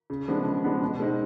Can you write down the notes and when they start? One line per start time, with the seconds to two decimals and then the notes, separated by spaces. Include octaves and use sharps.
0.10 C#3
0.28 F3 G#3 B3 D4
0.45 C#3
0.64 F3 G#3 B3 D4
0.82 B2
1.00 G#3 C4 D#4